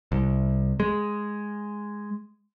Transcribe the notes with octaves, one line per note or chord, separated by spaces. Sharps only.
C2
G#3